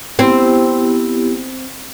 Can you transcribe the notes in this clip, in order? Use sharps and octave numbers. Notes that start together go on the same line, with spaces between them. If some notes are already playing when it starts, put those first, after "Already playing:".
B3 C4 E4 G4